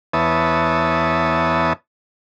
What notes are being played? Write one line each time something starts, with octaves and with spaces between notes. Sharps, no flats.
E2 B3 C#5 E5 A5 D#6